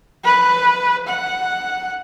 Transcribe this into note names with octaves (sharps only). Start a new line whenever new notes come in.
B4
F#5